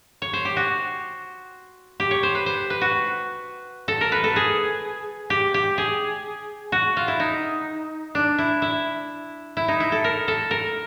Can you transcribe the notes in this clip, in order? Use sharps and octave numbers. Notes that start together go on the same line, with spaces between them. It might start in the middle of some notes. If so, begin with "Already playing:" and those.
C#5
C5
G4
F#4
G4
C#5
C5
B4
C5
B4
F#4
A4
A#4
B4
A4
G#4
G4
G4
G#4
F#4
F4
E4
D#4
D4
E4
E4
E4
D#4
E4
A4
A#4
A4
A#4